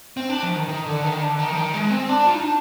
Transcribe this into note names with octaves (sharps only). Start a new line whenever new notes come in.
C4
D4
F3
D#3
D#3
D3
D#3
D3
D#3
F3
D#3
G#3
C4
D4
F4
D#4
D4